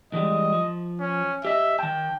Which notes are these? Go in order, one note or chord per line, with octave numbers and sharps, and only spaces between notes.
E3 G3 G#3 D#5
F3
C#4
G4 D#5 E5
D#3 G5 A5